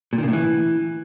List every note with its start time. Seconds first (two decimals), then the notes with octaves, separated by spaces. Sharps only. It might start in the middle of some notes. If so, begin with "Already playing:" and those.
0.13 A#2
0.18 D#3
0.23 C#3
0.28 A2
0.33 E3